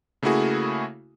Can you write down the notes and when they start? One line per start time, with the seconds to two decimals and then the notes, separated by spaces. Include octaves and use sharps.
0.22 C#3 A3 A#3 E4 F#4 G#4